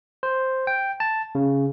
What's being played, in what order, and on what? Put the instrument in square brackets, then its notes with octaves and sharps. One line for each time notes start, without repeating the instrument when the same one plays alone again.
[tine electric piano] C5
G5
A5
C#3